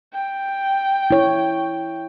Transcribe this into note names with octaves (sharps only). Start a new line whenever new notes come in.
G5
E4 C#5